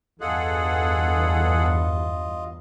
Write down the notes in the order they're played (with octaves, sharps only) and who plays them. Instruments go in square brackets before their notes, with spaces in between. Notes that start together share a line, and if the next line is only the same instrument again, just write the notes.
[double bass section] E2 G2 [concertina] F4 D#5 [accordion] G#4 A4 F#5